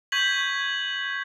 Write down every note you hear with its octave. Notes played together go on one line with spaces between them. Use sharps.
C#6 G6 G#6 B6 F#7